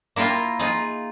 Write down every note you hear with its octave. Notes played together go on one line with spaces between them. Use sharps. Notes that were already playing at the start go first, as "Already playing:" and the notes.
A#3 E4 F4 A#4 G5
D#4 F4 G#4